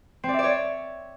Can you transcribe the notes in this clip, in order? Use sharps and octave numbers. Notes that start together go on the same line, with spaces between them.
C4
D5
E5
D5
C#5